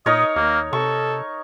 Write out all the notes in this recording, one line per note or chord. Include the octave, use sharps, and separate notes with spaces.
A#2 D#4 A#4 C#5 D#5
D#2 A#3
C3 A4 C#6